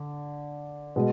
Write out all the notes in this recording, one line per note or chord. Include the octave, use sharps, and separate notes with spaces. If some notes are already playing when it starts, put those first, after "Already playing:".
Already playing: D3
B2 G#3